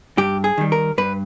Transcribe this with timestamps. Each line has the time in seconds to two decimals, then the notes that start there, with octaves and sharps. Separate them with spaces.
0.18 G2 G4
0.44 G#4
0.58 D#3 G3
0.72 A#4
0.98 G2 B4